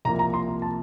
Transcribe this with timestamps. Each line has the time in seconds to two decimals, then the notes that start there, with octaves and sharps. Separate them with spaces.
0.05 C2 C3 F3 A#3 A#5
0.19 A#5
0.34 C6
0.48 A#5
0.62 A5